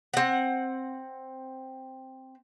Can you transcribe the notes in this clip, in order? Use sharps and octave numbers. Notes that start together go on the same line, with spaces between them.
C4 F#5